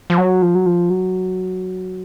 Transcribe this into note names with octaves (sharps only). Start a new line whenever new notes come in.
F3
F#3
F3
F#3
F3
F#3